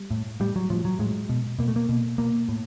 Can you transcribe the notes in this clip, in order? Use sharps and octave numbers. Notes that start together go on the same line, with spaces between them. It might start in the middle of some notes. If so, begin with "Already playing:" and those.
Already playing: G3
A2
A2 G3
F#3
A2 F3
F#3
A2 G#3
B2
B2 A#3
A3
A#3
B2
B2 A#3
A2